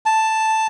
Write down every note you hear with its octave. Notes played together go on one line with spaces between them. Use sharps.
A5